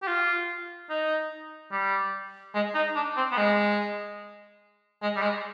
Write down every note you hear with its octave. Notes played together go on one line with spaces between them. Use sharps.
G4
F4
D#4
G3
G#3
D#4
D4
C4
B3
G#3
G#3
G3
G#3